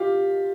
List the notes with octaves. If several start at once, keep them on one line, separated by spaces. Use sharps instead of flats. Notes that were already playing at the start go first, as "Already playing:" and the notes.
Already playing: F4 G4